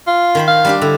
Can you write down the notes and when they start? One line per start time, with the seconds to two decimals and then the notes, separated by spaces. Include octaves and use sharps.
0.07 F4
0.35 D#3 C5 B5
0.48 F5
0.65 G3 D4 G4
0.81 D3 E4